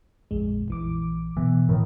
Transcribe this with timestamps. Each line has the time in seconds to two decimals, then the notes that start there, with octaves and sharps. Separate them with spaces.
0.31 A#1 F2 G#3
0.68 A#1 E3 D6
1.37 B2 E3
1.69 A2 D#3 A#4